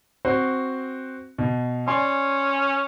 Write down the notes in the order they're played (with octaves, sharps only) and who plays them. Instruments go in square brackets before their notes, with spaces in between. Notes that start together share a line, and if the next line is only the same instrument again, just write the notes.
[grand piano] C4 F#4 C5
B2
[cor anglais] C#4 [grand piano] D5 G#5 C6